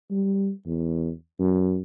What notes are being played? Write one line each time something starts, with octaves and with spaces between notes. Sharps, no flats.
G3
E2
F#2